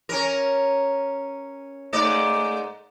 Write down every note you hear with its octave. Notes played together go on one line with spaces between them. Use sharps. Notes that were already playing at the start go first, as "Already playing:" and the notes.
C#4 A#4
G#2 A3 D5